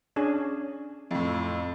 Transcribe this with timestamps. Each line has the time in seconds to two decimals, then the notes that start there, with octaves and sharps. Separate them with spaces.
0.16 C#4 D4 G#4
1.11 F2 A2